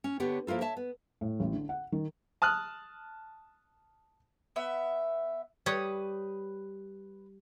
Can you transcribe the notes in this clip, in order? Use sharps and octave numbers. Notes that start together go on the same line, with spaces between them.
C#4
D3 B3 G4 C#5
F3 A#3 E4 F4 A4
C#5 E5 A5
B3
A2
A1
D3
F#5
D#3
A5 D#6 F6 F#6
B3 E5
G3 B4 C#5 D#6